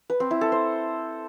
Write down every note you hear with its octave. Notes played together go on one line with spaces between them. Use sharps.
B4
C4
E4
A4
C5